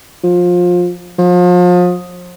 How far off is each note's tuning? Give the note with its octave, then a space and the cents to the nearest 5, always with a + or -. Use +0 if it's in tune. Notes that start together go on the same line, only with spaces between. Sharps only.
F3 +25
F3 +35